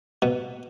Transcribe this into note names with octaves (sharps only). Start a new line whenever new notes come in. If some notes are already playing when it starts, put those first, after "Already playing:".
B2